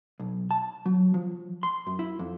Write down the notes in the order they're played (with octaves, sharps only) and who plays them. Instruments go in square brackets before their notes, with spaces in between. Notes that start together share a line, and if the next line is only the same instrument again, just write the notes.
[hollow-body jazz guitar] B1
A5
F#3
F3
C6
F#2
E4
F2